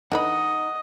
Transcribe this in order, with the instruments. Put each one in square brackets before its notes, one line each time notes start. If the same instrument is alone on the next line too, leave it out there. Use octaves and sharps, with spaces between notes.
[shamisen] D3 E3 B5 [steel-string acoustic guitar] D#4 [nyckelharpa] D#5 [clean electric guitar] F#5